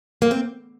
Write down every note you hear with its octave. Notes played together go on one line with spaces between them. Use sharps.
A#3
C4